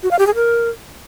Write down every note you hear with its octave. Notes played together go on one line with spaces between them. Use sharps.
F#4
F5
G4
G#4
A#4